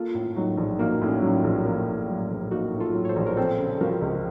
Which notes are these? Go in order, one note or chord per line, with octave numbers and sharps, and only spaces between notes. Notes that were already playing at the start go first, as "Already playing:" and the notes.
Already playing: A#3 F4 A4
A2
F#3 D#4 F#4
A#1
A#3 D#4 F#4
A2
C#4
F#3
C#4 F4
A#1
A#3
A2
F#3
A#1
A#3 D#4 F#4
A2
F4 A4
F#3
C#5
A4 C5
A#1
A#4
C4 A4 C5
C#3
A4
F3 F#4 A#4
C#2